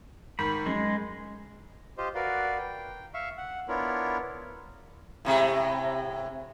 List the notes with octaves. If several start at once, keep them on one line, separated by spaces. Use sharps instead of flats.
G#2 D#3 B5
F#2 G#3
F4 G4 C5 D#5
F#4 A#4 B4 D5 F5
G5
E5 F5 C#6
F#5
B3 D4 E4 F4 A#4 C#5
A2 C3 G#3